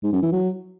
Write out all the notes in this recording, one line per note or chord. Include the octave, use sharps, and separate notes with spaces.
G#2
F#2
E3
F#3